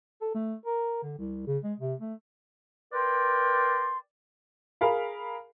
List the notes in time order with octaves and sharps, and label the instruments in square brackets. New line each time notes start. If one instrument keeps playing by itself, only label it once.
[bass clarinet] A4
A3
A#4
D3
C2
C#3
G#3
C3
A3
[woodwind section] A#4 B4 D5 G5 C6
[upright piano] G#4 A#4 F5 B5